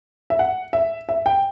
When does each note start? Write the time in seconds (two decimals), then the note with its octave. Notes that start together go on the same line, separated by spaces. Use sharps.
0.30 E5
0.39 F#5
0.73 E5
1.09 E5
1.26 G5